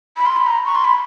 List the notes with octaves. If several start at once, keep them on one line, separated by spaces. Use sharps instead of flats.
B5
C6
B5
A#5
C#6
C6
B5